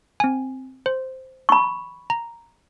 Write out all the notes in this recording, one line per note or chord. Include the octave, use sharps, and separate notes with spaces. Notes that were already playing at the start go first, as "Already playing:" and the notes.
C4 G#5
C5
B5 C#6
A#5